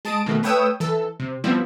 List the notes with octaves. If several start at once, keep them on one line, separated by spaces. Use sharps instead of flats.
G#3 A5 D#6 D7
B2 D#3 A3
A3 B4 C#5 G5 D#6 E6
E3 A4
C3
F3 G3 B3 C4 E4